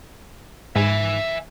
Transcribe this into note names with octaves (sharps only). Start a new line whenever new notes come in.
G#2 E5 G#5